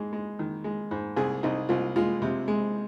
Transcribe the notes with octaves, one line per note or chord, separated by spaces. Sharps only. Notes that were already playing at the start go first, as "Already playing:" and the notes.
Already playing: G#2 G#3
G#3
D#3
G#3
G#2
C2 G#4
C2 D#4
C2 F4
G#3 F4
C3
G#3